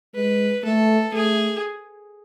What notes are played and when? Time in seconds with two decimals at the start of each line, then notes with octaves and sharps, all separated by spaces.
0.14 G#3 B4
0.64 A3 A4
1.13 A3 G#4